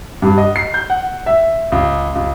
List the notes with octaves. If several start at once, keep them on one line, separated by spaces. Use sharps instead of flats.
G2
D#5
C7
G6
F#5
E5
C#2
C#2